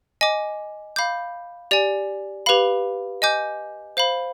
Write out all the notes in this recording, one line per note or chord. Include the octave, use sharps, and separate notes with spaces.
D#5 G#5 D6
F5 B5 D6 G6
G4 D5 G#5
G4 B4 F5 B5
D#5 G#5 D6 G6
C5 F5 B5